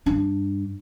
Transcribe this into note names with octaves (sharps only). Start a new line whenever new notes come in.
G2 D4